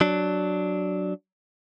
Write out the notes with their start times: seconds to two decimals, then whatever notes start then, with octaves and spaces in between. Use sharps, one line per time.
0.01 F#3 D4